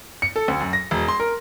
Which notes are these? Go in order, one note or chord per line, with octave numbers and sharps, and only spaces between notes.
C#7
A4
D2
F#2
A#6
E1
C6
A#4